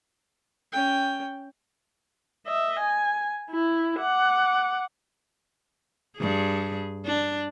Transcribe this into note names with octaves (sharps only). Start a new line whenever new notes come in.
C#4 G5
D#5 E5
G#5
E4
F#5 D6
G2 G#4
D4